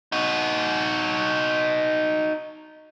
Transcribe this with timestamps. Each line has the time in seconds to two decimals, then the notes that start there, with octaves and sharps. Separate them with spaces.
0.12 D#4 F#4